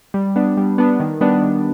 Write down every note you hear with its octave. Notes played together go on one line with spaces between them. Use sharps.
G3
B3 D4
G3
B3 D4
D#3
G3 B3 D4
D#3